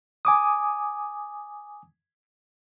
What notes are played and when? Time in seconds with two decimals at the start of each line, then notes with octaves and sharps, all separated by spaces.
0.25 G#5 D6 D#6